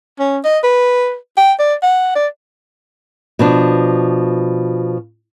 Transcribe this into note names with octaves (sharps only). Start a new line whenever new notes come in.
C#4
D#5
B4
G5
D5
F#5
D5
B2 F3 D4